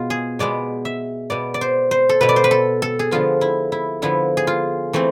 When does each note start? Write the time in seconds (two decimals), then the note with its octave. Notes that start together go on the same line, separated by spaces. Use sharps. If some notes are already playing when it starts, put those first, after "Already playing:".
Already playing: B2 G#3 B3 F4
0.10 G#4
0.39 B2 G#3 B3 D5
0.85 E5
1.30 B2 B3 D5
1.54 D5
1.61 C5
1.91 C5
2.09 A4
2.21 B2 B3 B4
2.29 D5
2.36 C5
2.44 B4
2.51 A4
2.82 A4
2.99 G#4
3.11 D3 F3 B3 F4
3.41 E4
3.72 E4
4.02 D3 F3 B3 E4
4.37 G#4
4.47 F4
4.93 E3 A3 C4